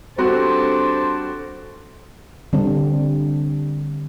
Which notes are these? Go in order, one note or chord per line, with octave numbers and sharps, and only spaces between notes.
G3 C4 D4 F#4 A4 C5
D3 G3 C4 D4